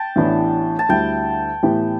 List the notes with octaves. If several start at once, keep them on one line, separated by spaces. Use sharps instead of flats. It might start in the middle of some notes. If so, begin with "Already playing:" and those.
Already playing: G5 A5
A1 A2 E3 B3 D4
A5
D2 D3 G3 E4 G5
A2 E3 B3 G4